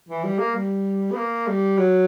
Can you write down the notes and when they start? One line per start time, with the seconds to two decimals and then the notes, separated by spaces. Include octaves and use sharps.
0.09 E3
0.24 G3
0.39 A#3
0.55 G3
1.11 B3
1.16 A#3
1.47 G3
1.78 F#3